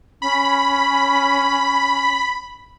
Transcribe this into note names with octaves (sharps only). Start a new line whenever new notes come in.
C#4 B5